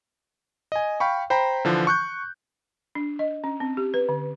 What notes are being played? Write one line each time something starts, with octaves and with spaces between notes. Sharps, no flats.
D#5 G#5
F5 G5 B5 C#6
C5 G5 A#5 B5
D3 E3 F3
C#6 F#6 G6
D4
D#5
C#4
C4
G4
B4
D3